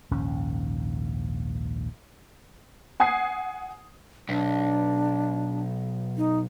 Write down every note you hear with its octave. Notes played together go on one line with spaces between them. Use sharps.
A#1 D#2 G#2 C#4
F#5 G#5 D#6 G#6 C7
B1 D4
D#4